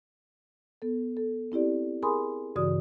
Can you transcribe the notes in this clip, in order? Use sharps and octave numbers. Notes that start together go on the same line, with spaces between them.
B3 A4
A4
C4 E4 G4 D5
G#4 A#4 G#5 B5 C6 D#6
G2 C#3 E3 F#4 D5 D#6